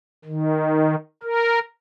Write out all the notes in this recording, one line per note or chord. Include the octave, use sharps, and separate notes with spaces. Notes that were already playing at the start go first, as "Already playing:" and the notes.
D#3
A#4